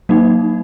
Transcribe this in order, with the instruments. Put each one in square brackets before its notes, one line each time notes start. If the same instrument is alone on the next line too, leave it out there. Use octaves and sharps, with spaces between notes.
[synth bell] F#3 A#3 D#4